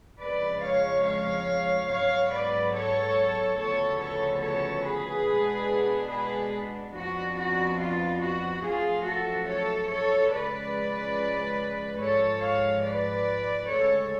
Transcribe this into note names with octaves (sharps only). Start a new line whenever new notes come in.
F2 C#3 F3 G#3 B4 D5
C#5 F5
C#5 F5
G#2 F#3 B3 C#5 F5
B4 D5
A4 C#5
D2 C#3 F3 B3 A4 C#5
A4 C#5
A4 C#5
G#4 B4
B2 G#3 B3 D4
G#4 B4
F2 F3 B3 D4 F#4
F#4
F4
F#4
F#2 F3 A3 F4 G#4
F#4 A4
A4 C#5
A4 C#5
C#3 F3 G#3 B4 D5
G#2 F3 G#3 A4 C#5
C#5 F5
B4 D5
D2 C#3 G#3 A4 C#5